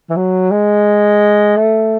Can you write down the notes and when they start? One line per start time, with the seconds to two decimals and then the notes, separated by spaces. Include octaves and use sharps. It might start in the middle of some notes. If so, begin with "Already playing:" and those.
0.10 E3
0.17 F#3
0.51 G#3
1.56 A3